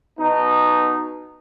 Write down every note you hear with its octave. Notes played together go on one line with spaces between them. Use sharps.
B2 D#4